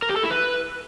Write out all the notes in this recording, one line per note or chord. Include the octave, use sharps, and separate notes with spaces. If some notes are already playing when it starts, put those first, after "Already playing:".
A#4
G4
A4
E4
B4